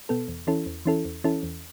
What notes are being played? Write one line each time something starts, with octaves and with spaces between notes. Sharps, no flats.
B2 B3 A4
E2
E3 C#4 E4 A4
E2
E3 C#4 E4 A4
E2
E3 C#4 E4 A4
E2